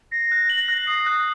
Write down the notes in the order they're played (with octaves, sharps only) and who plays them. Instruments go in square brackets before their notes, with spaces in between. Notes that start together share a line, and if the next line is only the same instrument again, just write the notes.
[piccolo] A#6 [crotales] C7
[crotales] F#6
F#7
F#6
[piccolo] D#6 [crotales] C7
[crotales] F#6